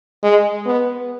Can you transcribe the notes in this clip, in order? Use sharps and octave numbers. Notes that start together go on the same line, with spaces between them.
G#3
B3